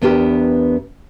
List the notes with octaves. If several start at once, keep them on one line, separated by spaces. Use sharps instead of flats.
E2 B3 D4 G4 A#4